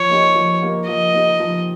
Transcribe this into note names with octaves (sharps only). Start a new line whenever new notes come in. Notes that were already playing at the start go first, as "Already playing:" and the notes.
Already playing: F3 C#5
A#3 D#4 G4
F3
A#3 D#4 G4
F3 D#5
A#3 D#4 G4
F3